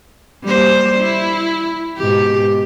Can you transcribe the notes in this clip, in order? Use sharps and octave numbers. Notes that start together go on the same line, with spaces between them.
G3 A#3 C5
E4
G#2 B2 G4